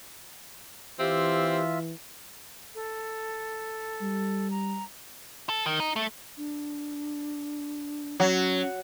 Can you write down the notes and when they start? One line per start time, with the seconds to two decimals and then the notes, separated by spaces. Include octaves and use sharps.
0.99 E3 C4 F4 G4 E5
2.75 A4
4.01 G3
4.51 A#5
5.49 A4
5.66 D#3
5.80 D#4
5.96 A3
6.37 D4
8.20 F#3 C#4